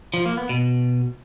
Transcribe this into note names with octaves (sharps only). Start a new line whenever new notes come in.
F3
A#3
B3
B2